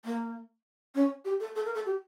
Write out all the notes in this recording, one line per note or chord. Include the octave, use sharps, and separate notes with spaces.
A#3
C#4
G4
A4
A4
A#4
A4
G4